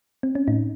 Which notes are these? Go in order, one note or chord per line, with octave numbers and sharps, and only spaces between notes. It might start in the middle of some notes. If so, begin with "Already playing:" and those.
C4
C#4
A2 D#4